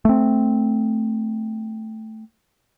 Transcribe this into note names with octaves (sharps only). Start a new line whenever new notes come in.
A3 C4